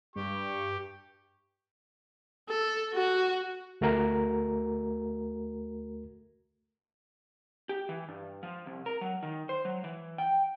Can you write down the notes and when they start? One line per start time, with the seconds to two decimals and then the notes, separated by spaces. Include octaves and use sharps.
0.16 G2 G4 C#6
2.49 A4
2.94 F#4
3.81 D2 A3 F#4 A#4 A#5
7.69 G4
7.89 E3
8.08 G2
8.43 F3
8.66 C2
8.86 A#4
9.01 F#3
9.23 D#3
9.49 C5
9.65 F#3
9.84 E3
10.18 G5